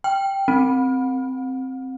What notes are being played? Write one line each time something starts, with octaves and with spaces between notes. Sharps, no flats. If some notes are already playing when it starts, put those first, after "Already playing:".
G5
C4